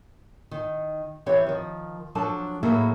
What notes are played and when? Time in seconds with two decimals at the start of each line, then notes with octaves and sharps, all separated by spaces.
0.51 D#3
1.26 E3 C4 G4 C#5
1.47 D#3 F3
2.15 F3 F#3 D4 A4 A5
2.63 A2 F#3 A#3 E4 G#4 A4